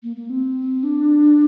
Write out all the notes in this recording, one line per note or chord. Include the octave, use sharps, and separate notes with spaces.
A#3
A#3
C4
D4